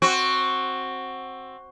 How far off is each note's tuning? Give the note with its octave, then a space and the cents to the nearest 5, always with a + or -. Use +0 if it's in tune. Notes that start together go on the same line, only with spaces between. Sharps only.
C4 +15 F#4 +0